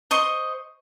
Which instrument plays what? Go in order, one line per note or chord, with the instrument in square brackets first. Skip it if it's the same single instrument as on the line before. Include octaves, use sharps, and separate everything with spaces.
[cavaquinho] C5 D#5 C#6